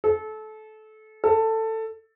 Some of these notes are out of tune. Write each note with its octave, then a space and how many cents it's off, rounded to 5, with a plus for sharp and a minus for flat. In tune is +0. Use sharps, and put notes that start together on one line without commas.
A4 -25
A4 +15